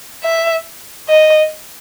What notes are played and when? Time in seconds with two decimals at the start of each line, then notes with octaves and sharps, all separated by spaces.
0.24 E5
1.09 D#5